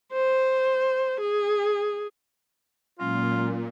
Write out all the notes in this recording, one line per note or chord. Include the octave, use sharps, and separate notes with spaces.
C5
G#4
A#2 F#3 G#3 C#4 F4